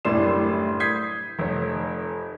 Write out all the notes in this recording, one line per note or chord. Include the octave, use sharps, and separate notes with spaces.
F#1 A2 G3 D4 C6 E7
D#6 G6 G#6 B6 C7
F1 C#5